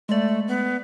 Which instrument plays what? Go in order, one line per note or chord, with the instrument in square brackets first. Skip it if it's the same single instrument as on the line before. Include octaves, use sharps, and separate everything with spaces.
[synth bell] G#3 D5 [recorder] A3
[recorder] B3